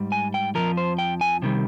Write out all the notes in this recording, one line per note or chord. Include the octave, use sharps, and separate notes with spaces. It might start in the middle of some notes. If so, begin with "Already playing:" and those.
Already playing: G#2 G3
G#5
G5
F2 C3 F3 A#4
C5
G5
G#5
C3 D#3 G3